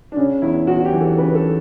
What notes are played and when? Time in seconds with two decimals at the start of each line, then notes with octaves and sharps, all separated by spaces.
0.12 D4
0.16 C#3 C#4
0.42 E2 E4
0.67 E2 F#4
0.85 G4
0.93 E3
1.01 A4
1.18 C#3 B4
1.35 A4